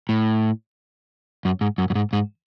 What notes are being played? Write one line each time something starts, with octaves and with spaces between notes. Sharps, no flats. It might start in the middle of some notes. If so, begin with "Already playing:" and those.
A2
F#2
G#2
F#2
F#2
G#2
G#2